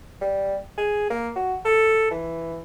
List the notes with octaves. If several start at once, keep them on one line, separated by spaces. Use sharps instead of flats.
G3
G#4
A#3
F#4
A4
E3